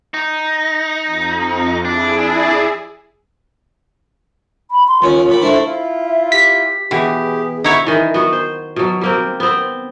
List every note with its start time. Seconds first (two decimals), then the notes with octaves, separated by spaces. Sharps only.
0.14 D#4
1.06 F2
1.85 D4 E4 G#4
4.71 B5
4.88 C6
5.02 D#2 C#4 F4
5.29 A#2 B5
5.42 A3 D4 E4 C5
5.65 E4 F4
6.04 E5
6.32 G4 B6
6.91 B2 E3 G4 G#4
7.64 D#4 E4 F#4 C#5
7.87 D#3 E3
8.14 B3 F#4
8.33 C5
8.76 B2 F#3
9.01 G3 A#3 C4
9.40 B3 C4